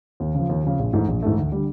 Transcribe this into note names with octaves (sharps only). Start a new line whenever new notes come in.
D#2
C#3 F3
D#2
C#3 F3
A#1
G#2 E3 A3
A#1
G#2 E3 A3
D2
D3 G3